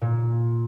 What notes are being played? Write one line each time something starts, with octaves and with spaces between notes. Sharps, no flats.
A#2